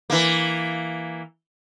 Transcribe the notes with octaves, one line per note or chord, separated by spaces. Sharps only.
E3 A#3